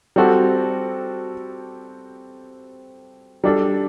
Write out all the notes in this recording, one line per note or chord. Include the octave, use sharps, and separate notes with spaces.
G3 C4 F#4 A4
G3 D4 A4